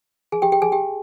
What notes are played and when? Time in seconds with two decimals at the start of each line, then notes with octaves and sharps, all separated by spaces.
0.32 G#4 G#5
0.42 G4 G5
0.52 G4 G5
0.62 G#4 G#5
0.72 G4 G5